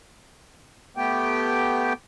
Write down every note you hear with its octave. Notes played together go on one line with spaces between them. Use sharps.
A3 B3 G4 G5